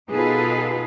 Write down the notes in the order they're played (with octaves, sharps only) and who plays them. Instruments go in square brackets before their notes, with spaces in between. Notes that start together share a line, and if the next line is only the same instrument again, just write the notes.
[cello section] B2 D#4 F4 G#4 A4 B4